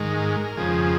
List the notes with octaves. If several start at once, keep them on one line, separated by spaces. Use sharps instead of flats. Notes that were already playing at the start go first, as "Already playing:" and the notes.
Already playing: G#2 D#3 G#3 A#4
F2 C#3 F3 G#4